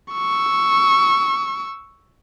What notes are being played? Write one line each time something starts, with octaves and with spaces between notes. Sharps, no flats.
C#6 E6